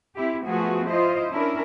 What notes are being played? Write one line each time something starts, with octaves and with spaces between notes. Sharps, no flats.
C4 E4 G4
F3 A3 B3 F#4 G#4
E4 F4 C5 D#5
C#4 D4 E4 A#4